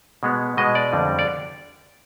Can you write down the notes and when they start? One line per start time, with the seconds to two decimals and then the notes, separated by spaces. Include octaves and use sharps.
0.23 B2 G#3 B3
0.57 B2 G#3 B3 D#5
0.75 D5
0.93 F2 D3 G3
1.19 D5